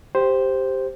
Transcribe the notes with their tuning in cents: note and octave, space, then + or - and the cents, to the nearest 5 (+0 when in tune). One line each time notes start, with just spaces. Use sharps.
G4 +0 C5 +0